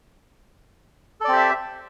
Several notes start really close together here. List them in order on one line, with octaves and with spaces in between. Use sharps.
A4 D5 C4 G4 E5